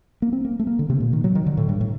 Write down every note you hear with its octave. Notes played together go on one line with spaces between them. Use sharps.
A#3
C4
A#3
A3
A#3
D3
C3
A#2
D#3
F#3
D#3
D3
A2
G2
A2